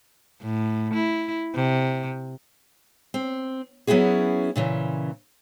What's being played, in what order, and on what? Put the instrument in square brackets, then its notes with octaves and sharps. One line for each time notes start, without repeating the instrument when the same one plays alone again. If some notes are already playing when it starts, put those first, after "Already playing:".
[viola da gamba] A2
E4
C3
[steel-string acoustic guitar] C4
F#3 B3 C#4 E4 F#4 G#4
A#2 C#3 E3